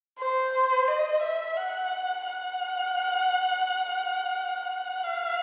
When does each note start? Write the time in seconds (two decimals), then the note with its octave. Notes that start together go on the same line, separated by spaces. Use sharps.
0.19 C5
0.88 D#5
1.22 E5
1.57 F#5
2.26 F#5
5.03 F5